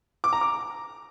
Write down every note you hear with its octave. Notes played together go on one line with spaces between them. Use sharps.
D6
A#5
D6